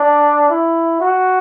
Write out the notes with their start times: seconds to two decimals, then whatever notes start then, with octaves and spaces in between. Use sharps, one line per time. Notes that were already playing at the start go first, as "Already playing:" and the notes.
Already playing: D4
0.50 E4
1.01 F#4